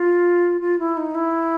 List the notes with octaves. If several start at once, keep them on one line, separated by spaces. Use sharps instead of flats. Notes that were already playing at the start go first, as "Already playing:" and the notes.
Already playing: F4
F4
E4
D#4
E4